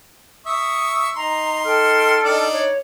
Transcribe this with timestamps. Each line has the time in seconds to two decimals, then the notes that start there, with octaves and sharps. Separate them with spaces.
0.46 E5 C#6 D#6
1.16 D#4 A#5 C6
1.66 A4 G5 F6
2.24 D4 D#4 D5
2.51 C#5